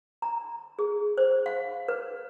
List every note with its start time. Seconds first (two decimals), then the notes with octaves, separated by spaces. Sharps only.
0.22 A#5
0.79 G#4
1.17 C5
1.46 F5
1.88 B4